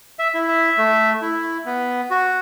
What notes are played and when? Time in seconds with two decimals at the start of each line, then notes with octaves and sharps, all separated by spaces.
0.19 E5
0.34 E4
0.48 E5
0.78 A3
1.22 E4
1.66 B3
2.11 F#4